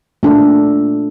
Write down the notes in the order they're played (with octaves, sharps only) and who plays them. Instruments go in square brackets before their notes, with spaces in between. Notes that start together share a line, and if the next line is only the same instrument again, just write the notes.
[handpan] A#2 A3 D4 A4